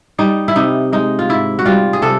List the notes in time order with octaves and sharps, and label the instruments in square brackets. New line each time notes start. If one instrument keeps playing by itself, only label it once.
[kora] G3 D#4
E4
C3 D#4
G#3 D#4
F4
G#2 E4
F#4
G3 F4
G#4
C3 A4